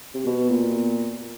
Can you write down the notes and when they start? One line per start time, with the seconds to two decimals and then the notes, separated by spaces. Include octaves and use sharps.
0.14 C3
0.26 B2 B3
0.49 A#2